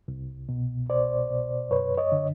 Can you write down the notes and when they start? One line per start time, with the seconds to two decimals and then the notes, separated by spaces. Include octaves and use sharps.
0.08 C2
0.49 B2
0.89 C2 C5 D5
1.30 B2
1.70 F#2 B4 C#5
1.97 C#5 D#5
2.12 D3